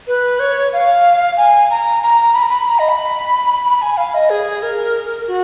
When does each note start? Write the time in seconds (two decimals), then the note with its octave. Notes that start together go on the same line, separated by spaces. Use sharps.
0.08 B4
0.40 C#5
0.73 F5
1.37 G#5
1.70 A#5
2.03 A#5
2.35 B5
2.42 A#5
2.49 B5
2.67 A#5
2.79 D#5
2.89 B5
3.65 B5
3.82 G#5
3.97 F5
4.14 D#5
4.30 G#4
4.63 A#4
5.28 F#4